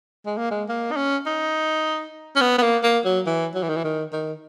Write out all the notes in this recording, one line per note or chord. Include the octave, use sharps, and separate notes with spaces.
G#3
A#3
G#3
A#3
D#4
C#4
D#4
C#4
B3
B3
A#3
A#3
F#3
E3
F#3
E3
D#3
E3
D#3
D#3